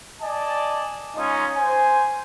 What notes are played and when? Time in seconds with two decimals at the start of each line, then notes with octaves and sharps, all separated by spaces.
0.21 D5 D#5 G#5 A5
1.16 G#3 C#4 D#4 F4 D#5
1.57 C5 G#5